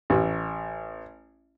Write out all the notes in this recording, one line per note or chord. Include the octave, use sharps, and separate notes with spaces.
A1